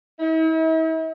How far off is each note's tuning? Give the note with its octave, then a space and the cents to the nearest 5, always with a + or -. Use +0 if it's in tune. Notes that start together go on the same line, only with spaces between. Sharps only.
E4 -45